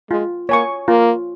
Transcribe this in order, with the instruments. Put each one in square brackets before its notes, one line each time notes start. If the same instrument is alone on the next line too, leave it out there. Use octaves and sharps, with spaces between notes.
[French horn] G#3 [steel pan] F4
[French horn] A#3 [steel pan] C#5 G#5 C#6
[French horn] A#3 [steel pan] F4